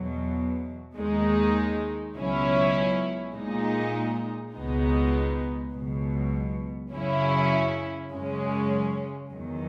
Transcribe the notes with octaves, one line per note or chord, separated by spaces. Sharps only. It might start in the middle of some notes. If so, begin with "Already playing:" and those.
Already playing: E2 B2 F#3
D#2 D#3 G#3 D#4
C#2 B2 F#3 C#4 E4
A#2 G#3 D#4
C#2 B2 G#3 B3 D#4
C#2 B2 F#3
F#2 C#3 F#3 C#4 E4
F#2 C#3 G#3 C#4
E2 D#3 F#3